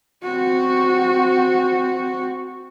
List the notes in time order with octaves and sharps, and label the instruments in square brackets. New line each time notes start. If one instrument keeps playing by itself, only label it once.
[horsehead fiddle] C4 F#4